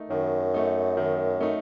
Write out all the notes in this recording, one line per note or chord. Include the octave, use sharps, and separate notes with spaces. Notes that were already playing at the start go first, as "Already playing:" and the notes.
Already playing: D#3 A3 D#4
F#2 D#3
A3 D#4
D#3
A3 D#4